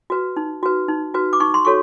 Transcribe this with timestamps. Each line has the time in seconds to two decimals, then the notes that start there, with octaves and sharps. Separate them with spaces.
0.10 F#4 B4
0.36 D#4
0.63 F#4 B4
0.88 D#4
1.14 F#4 B4
1.33 D6
1.40 D#4 C#6
1.54 C6
1.65 F#4 A4 C#5 C#6